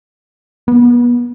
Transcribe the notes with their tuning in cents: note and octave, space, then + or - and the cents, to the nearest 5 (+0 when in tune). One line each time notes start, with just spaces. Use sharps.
B3 -35